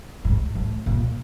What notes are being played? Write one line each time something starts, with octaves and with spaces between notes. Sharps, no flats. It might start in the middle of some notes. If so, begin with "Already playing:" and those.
G#2
A2
A#2